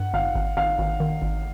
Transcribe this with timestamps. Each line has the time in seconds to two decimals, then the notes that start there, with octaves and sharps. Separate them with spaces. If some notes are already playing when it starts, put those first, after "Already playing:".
Already playing: G2 F#5
0.14 G#1 F5
0.35 G#1
0.57 G#1 F5
0.78 G#1
1.00 D#3
1.22 G#1